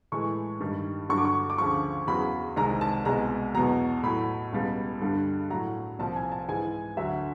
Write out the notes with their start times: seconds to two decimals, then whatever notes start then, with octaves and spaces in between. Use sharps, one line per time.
0.12 A2 E3 G#3 C#6
0.60 G2 D#3 G3
1.09 G2 D3 F#3 C#6
1.17 D6
1.25 C#6
1.50 D6
1.58 D2 C#3 F3 C#6
2.07 E2 C#3 F#3 B5
2.56 C2 C3 D#3 G#3 A#5
2.81 A5
3.05 C2 B2 G#3 A#5
3.55 E2 B2 F#3 A#5
4.03 A2 F#3 B5
4.53 C#2 B2 G3
5.01 G2 D3 G3
5.50 A2 F#3 A#5
5.99 C2 A#2 F3 A5
6.16 G#5
6.32 A5
6.48 G#2 E3 G#3 G#5
6.97 D2 D3 F#3 E5